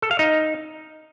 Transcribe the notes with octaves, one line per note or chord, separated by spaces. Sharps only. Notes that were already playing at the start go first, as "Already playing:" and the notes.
A4
F5
D#4